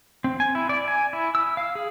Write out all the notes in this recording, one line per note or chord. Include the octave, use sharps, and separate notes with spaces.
C4
G#5
E4
D5
G#5
E4
E6
F5
G#4